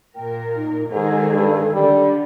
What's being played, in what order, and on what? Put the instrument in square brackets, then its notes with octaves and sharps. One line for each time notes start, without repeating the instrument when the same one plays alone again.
[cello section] A#2 A#4 [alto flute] G5
[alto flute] D#4
[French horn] G#2 [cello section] D#3 G#3 G#4 [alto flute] A4
[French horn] G2
[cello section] D3 [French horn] G3